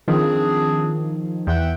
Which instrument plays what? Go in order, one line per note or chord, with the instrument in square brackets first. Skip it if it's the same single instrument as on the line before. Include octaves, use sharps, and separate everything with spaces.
[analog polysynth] D#3 F3 [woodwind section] C4 D4 G#4
[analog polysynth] E2 [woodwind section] E5 F#5 G5